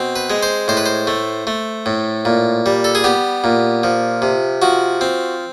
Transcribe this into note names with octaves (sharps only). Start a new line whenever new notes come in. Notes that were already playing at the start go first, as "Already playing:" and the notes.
Already playing: B2 C4
B4
G#3
C5
A2 C5
B4
C5
A3
A3
A2
A#2
G3
A4
G#4
B3 G4
A#2
F3
C3
F3 F#4
C4